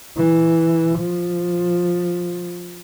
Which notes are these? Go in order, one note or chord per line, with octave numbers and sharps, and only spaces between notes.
E3
F3